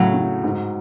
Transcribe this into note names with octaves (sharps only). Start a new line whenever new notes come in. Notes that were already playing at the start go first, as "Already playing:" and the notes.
Already playing: A2 C#3 F#3
A2
G#2